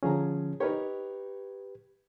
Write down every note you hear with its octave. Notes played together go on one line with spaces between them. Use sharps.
D3 F3 C#4 G#4 A#5
D#4 G4 A#4 B4 C#5